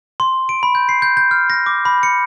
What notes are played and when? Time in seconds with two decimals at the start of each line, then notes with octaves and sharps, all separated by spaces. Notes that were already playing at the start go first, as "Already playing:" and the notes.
0.20 C6
0.49 D7
0.63 B5
0.75 G6
0.89 C7
1.02 G6
1.17 G6
1.31 F6
1.50 A#6
1.66 D6
1.85 B5
2.03 C#7